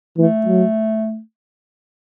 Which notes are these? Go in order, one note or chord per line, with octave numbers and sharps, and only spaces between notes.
E3 A3
F#3